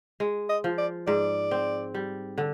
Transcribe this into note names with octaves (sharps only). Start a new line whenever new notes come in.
G#3
D#5
F3
D5
G#2 D5
C4
G3
D3